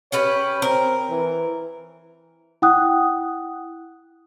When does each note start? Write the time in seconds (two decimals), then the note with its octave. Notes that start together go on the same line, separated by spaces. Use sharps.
0.12 C#4 G4 B4 C#5
0.62 C4 A#4
1.10 E3
2.62 E4 F#5 G5 D#6 F#6